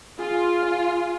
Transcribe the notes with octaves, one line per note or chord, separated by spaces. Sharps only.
F4 G#4
F5